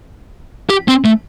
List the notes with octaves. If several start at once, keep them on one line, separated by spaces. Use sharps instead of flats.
G4
C4
A3